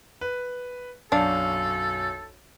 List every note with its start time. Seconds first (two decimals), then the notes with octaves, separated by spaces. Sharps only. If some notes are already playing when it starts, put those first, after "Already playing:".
0.21 B4
1.12 B1 F#2 D4 A4 F5